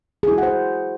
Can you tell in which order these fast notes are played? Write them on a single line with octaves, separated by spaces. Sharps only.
G#4 E4 F#4 F#5 C5